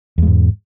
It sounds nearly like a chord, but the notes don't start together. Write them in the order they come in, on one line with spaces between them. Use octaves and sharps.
E2 G#3 G#2